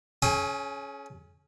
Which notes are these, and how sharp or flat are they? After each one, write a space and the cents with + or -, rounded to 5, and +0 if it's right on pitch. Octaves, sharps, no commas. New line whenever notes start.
C#4 +0 G#4 +40 G#5 -35